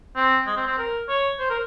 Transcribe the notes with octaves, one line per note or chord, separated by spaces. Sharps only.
C4
G#3
C4
C4
A#4
C#5
C5
A#4